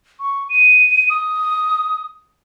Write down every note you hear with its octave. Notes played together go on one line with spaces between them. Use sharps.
C#6
D#7
D#6